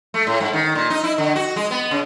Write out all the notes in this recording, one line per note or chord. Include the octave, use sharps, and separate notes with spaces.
A3
A2
G#2
D#3
A#2
D#4
E4
D3
F#4
G#3
B3
C#3